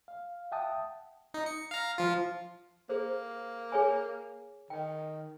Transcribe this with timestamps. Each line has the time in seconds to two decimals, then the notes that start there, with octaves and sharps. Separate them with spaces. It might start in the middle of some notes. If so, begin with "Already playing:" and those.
0.08 F5
0.52 E5 F#5 G5 A5 D#6
1.34 D#4
1.46 C#7
1.71 F5 A#5
1.98 F3 F4
2.89 A#3 G#4 C5
3.72 G#4 C#5 G#5
4.70 D#3 G5